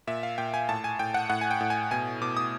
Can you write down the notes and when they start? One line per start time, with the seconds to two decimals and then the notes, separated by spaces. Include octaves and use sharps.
0.07 A#2 E5
0.23 F5
0.38 A#2 G5
0.54 G#5
0.69 A2 A5
0.84 G#5
0.99 A2 G5
1.14 F#5
1.30 A2 F#5
1.41 G#5
1.51 G5
1.61 A2
1.70 G#5
1.91 B2 G#5
2.22 B2 D6
2.37 D#6